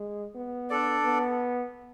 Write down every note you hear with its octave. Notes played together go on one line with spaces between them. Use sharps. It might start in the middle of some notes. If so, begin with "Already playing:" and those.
Already playing: G#3
B3
D4 A4 D5
B3